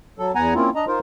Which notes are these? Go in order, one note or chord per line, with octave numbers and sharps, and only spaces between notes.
F#3 A4
E2 B3 F#5 G#5 A#5
A#3 C4 C#4 E4 F4
D4 D#5 A#5
D#4 F4 A#4 C5